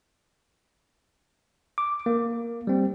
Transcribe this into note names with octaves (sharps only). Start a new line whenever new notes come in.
D6
A#3
G3 C4